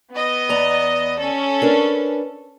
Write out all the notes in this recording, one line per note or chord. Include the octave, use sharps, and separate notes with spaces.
B3 D#5
E2 D5 A#5
C#4 A4
D4 A#4 B4